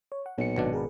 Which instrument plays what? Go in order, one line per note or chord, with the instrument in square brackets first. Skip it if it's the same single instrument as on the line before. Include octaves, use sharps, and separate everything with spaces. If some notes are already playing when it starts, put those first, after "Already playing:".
[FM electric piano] C#5
F#5
[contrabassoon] B1 [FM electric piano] A#2 C#7
[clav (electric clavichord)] G#1 B2 D4
[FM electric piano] G#4 A#4 B4